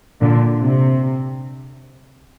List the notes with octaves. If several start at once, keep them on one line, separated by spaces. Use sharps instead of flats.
A#2 D3
C3